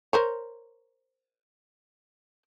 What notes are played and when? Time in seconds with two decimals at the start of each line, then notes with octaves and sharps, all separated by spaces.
0.13 A#4 C5 C#5